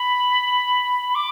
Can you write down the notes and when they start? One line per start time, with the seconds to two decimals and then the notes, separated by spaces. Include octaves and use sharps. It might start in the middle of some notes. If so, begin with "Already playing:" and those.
Already playing: B5
1.14 D6